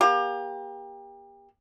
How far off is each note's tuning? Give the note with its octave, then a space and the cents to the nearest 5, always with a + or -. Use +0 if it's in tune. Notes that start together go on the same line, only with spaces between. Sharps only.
A#3 +35 G4 +30